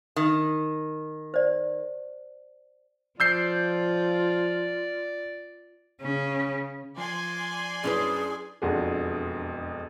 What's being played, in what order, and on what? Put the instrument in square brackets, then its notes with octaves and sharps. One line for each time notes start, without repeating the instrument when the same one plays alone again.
[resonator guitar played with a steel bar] D#3
[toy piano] C5 D5
[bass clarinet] F3 [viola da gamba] F4 [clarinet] D5 [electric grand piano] E6 G6 C7
[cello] C#3 C#4
[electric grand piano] F3 [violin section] D5 G#5 C6
[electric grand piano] F#2 C#4 [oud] D4 E4 B4 [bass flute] G#4
[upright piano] E1 F2 D4 F#4 G#4